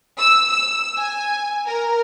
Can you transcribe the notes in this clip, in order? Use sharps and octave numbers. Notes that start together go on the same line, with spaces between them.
E6
E6
G#5
A#4